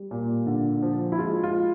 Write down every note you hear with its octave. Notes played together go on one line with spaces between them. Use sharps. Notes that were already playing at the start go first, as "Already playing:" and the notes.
Already playing: G3
A#2
D3
F3
E4
G#3 F4
F4